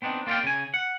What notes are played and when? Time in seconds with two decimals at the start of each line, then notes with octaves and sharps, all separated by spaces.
0.02 B3 C4 D4 D#4
0.27 A#3 F4 D5 E5 F5 G5
0.43 C#3 G#5
0.74 F#5